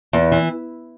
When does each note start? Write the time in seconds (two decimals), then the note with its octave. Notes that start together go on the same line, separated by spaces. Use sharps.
0.13 E2
0.32 E3